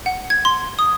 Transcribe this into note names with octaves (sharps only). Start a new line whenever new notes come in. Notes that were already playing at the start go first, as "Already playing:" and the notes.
F#5
G#6
C6
D#6